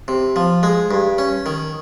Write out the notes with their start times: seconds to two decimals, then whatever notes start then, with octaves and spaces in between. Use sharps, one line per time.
0.08 C3
0.36 F3
0.63 G#3
0.91 G2
1.18 C#4
1.46 D#3